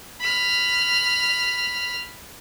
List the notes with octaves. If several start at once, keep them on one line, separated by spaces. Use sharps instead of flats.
B5 F6